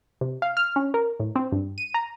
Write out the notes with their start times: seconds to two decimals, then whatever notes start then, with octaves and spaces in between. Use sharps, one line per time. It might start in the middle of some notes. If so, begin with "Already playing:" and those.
0.21 C3
0.42 F5
0.57 F6
0.76 C#4
0.94 A#4
1.20 A2
1.36 C4
1.52 G2
1.78 D#7
1.94 A#5